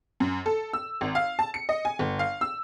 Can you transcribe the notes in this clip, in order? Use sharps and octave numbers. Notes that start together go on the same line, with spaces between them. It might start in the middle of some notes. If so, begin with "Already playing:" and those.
F#2
A4
E6
G#1
F5
A5
C#7
D#5
G#5
G1
F5
E6